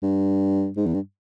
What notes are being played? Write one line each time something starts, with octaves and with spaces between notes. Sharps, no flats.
G2
G#2
E2
G2